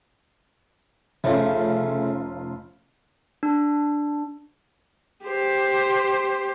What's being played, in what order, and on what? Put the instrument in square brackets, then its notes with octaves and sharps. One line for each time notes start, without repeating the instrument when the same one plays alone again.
[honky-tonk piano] F1 C#4 F4 [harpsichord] C#3 A3
[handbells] D4
[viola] G4 C5